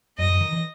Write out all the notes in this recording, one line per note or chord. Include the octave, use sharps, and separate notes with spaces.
F#2 D#5
F#2
D#3
E3